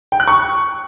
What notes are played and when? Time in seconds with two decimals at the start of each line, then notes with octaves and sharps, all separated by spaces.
0.12 G5
0.20 F#6
0.28 C#6